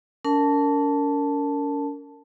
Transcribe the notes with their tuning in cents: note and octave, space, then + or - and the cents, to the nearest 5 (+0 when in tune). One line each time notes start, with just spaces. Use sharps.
C#4 +45 A#4 -20 A5 +0